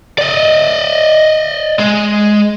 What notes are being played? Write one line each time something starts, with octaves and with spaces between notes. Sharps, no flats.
D5 D#5
G#3